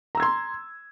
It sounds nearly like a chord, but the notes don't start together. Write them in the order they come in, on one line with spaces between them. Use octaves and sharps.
A#5 E6 G#6 C6